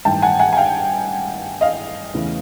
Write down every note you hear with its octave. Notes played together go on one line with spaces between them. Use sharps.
A1 G2 D#3 G5 A5
F#5 G#5
F#5 G#5
G#5
F5 G5
D#5 F5
E2 C#3 E3 A3